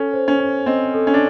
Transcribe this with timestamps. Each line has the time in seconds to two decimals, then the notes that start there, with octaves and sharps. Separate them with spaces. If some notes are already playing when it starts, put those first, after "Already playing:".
Already playing: C#4 A4
0.13 C5
0.28 C#4
0.40 G#5
0.66 C4 D#5
0.94 A4
1.07 C#4
1.14 D4